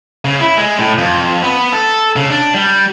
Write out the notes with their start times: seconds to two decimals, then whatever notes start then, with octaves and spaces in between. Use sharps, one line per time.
0.25 C#3
0.40 E4
0.57 G#3
0.79 A2
0.98 F2
1.43 B3
1.72 A4
2.16 C#3
2.30 D4
2.55 G3